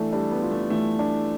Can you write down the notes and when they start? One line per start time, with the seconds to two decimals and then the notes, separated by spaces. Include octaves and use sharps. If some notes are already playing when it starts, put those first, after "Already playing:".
Already playing: E3 A3 D4
0.13 G3 D4
0.32 B3
0.42 F4
0.51 A3
0.70 E3 A3
0.99 D4